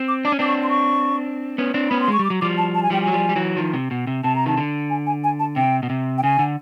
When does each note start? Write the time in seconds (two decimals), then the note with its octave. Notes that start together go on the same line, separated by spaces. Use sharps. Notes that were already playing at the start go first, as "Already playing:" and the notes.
Already playing: C4
0.08 D6
0.25 D4 D6
0.32 C#4
0.39 C4 D4 D6
0.47 C#6
0.63 C6
0.70 C#6
1.58 B3 C#4
1.74 C4 D4
1.89 B3 C#4 B5
2.01 C6
2.08 G#3 C#6
2.19 G3 D6
2.30 F#3
2.41 F3 G3 D6
2.58 A5
2.75 A5
2.83 G#5
2.90 F3 G3 G5
3.02 G#5
3.07 F#3
3.13 F3 G3
3.29 G3
3.36 E3 F#3
3.57 D#3 F3
3.73 C3
3.91 B2
4.07 C3
4.24 C3 A5
4.36 A#5
4.46 D#3 A5
4.58 D3
4.90 G#5
5.07 G#5
5.24 G#5
5.39 A5
5.56 C3 G5
5.83 B2
5.90 C3
6.18 G5
6.23 C#3 G#5
6.39 D3